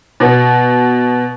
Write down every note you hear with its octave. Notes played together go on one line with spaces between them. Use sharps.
B2